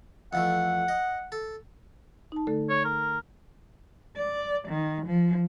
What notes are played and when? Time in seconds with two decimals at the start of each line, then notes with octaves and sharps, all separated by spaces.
0.33 F2 E3 A3 F#5
0.88 D#5
1.32 A4
2.32 D#4 A5
2.47 D3 A3 A4
2.70 C#5
2.84 A#4
4.17 D5
4.67 D#3
5.06 F3